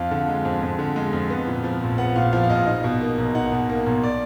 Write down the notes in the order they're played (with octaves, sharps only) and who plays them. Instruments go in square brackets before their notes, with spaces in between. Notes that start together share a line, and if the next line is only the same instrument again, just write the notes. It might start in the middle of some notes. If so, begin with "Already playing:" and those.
Already playing: [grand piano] F2 F5
D3
G#3
F2
F2
D3
G#3
F2
B3
A#2
F3
A#1
B3 F#5
A#2 F5
F3 F5
F5
A#1 D#5
D#4
B2
A#3
B1
D#4 F#5
B2
A#3
B1
D5